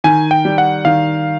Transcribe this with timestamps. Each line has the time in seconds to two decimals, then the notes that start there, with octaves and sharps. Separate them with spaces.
0.04 D#3 G#5
0.31 G5
0.45 G3
0.58 F#5
0.85 D#3 F5